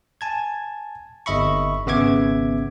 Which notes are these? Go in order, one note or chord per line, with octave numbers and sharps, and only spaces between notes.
G#5 A5 G#6
G1 D#5 E5 B5 C#6
G#1 C#3 B3 E5 D6 G#6